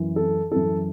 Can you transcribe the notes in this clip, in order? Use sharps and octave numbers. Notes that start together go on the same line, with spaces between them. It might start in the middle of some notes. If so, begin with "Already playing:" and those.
Already playing: F#2 E3
A4
F#2 E3 A4